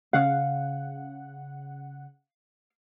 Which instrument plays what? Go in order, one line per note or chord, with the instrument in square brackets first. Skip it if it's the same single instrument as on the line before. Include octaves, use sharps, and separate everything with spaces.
[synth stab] C#3 F#5 [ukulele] F5